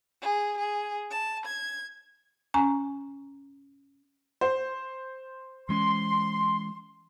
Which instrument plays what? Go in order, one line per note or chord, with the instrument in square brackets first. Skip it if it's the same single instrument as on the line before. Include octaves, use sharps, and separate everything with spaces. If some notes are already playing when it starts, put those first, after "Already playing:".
[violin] G#4
G#4
A5
G#6
[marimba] C#4 G#5 A#5
[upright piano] C5
[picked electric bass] E3 G#3 C#4 [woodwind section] C6